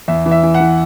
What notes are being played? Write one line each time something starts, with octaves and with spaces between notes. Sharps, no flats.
E2 E5
E3
E5
E3
F#5
E3